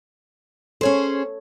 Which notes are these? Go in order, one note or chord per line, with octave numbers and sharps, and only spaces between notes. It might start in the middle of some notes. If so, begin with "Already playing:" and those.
C#4 G#4 A4 C5 C#5